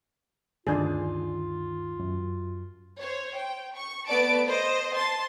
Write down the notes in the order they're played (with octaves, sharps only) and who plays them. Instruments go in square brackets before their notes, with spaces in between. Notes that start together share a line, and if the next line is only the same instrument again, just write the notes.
[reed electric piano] D2 G2 D#3 [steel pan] D4 G#4 [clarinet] F4
[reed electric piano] F#2
[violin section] C5 C#5
G5
C#6
A3 B3 D5 A5 D7
C5 D#5
A5 C6